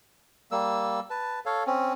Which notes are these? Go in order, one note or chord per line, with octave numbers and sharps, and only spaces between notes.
G3 A#3 E6
B4 A5
A4 C#5 F5
C4 C#4